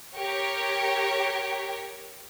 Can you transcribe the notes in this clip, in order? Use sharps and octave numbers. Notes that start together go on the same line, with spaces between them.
G4 A#4 C#5